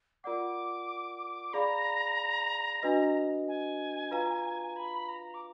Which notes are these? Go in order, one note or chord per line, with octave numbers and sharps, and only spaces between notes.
F4 A#4 D5 F#5 D6
G#4 D5 F5 A#5 B5
D4 F#4 B4 D#5
G#5
F4 B4 F5 A#5
B5
A#5
D6